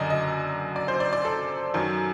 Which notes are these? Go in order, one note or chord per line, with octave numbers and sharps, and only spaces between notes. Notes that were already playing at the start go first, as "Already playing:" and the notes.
Already playing: F#1 F#2 D3 D5 D#5
D#5
D5
C5
D5
D5
A4
F#2 D#3 F#3